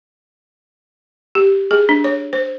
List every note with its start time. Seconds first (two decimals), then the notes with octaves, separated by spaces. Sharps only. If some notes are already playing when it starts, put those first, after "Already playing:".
1.35 G4
1.71 G#4
1.89 D4
2.04 C#5
2.33 C5